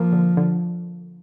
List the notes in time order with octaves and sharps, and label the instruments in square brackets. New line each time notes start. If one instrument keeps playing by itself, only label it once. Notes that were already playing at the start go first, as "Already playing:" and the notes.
Already playing: [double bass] F3 [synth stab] A#3
[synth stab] D3
D3